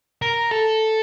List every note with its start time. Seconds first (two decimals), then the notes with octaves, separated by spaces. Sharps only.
0.22 A#4
0.51 A4